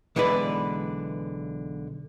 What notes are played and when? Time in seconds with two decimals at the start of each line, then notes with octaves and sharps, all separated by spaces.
0.16 B1 D3 E3 G#3 B4 D5